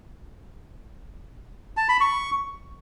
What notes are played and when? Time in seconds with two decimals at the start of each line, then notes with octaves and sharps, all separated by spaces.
1.77 A5
1.89 B5
2.01 C#6